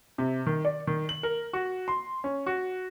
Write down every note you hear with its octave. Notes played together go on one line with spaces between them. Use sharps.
C3
D#3
D5
D#3
F#7
A#4
F#4
C6
C#4
F#4